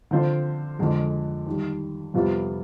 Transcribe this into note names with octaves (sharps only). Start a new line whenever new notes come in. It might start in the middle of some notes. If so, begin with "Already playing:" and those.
D3 F3 C4 F4 C5
F2 D3 G#3
D#2 D#3 G3
F2 C3 G3 B3 F4